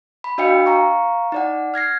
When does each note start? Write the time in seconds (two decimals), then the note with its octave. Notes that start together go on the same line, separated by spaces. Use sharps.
0.24 B5
0.38 D4 F#4 D#5 F5 G5 C#7
0.66 F5 A#5 C#6
1.32 D#4 D5 F#5
1.74 F6 G#6 A#6 C7